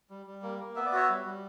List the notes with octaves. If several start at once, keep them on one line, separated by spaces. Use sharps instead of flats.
G3
G3
A#3
A#3
B3 E5
D5
F#4 C#5 E5
G3
G3